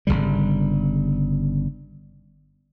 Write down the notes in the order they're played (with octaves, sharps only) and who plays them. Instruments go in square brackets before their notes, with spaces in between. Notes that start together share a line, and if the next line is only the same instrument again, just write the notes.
[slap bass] G1 C2 C#3 G3